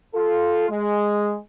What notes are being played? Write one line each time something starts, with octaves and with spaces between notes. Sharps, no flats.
F4 A4
G#3